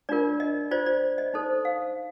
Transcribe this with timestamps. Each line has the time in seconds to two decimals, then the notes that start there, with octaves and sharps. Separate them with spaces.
0.09 D4 F4 A#4 D5
0.40 D#5
0.71 F4 C5 D5
0.86 D5
1.18 D#5
1.34 D#4 A4 C5
1.65 F5